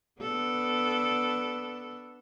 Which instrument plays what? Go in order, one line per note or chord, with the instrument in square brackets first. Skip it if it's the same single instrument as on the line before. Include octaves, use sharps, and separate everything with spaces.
[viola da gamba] B3 D4 A4